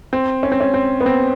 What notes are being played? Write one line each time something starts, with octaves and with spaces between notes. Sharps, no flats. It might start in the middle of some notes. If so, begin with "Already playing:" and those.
C4
C#4
C4
C#4
C4
B3
C4